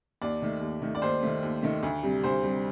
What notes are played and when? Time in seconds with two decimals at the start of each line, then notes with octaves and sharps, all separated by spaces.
0.22 D#2 D5
0.42 D#3 A3
0.61 D#2
0.82 D#3 A3
0.95 D5
1.02 D#2 C5
1.23 D#3 A3
1.43 D#2
1.63 D#3 A3
1.83 D2
2.03 C3 G3
2.24 D2 C5
2.43 C3 G3